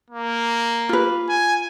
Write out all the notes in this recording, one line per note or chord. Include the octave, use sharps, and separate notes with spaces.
A#3
F4 B4
G#5